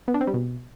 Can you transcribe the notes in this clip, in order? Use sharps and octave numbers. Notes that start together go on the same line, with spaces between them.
B3
D4
C4
G3
B2